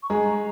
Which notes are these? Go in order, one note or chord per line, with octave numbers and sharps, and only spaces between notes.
C#6
G#3 G#4 A#5